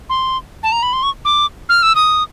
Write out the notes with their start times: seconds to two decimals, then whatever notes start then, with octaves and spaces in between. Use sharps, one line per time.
0.10 C6
0.63 A5
0.72 A#5
0.83 B5
0.93 C6
1.03 C#6
1.25 D6
1.69 F6
1.83 E6
1.95 D#6